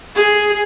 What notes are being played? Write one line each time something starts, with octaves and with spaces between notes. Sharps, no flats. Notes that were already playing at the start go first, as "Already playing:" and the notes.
G#4